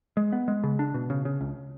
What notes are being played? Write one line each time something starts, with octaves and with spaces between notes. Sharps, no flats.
G#3
B3
G#3
C#3
D4
B2
C#3
C#3
C#2